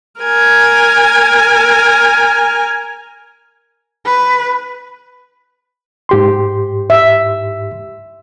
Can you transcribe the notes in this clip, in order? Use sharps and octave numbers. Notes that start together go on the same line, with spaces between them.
A#4 G#5
B4
G#2 G4 C6
E5